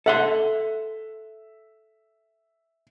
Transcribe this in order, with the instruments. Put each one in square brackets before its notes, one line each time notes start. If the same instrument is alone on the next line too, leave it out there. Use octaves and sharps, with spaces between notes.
[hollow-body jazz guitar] A4 F#5 C6 [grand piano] E5